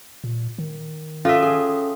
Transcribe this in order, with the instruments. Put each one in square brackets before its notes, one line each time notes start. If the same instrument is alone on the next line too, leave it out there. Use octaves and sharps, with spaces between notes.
[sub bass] A#2
D#3
[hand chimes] C#4 A4 [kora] F4 E5
[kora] G#4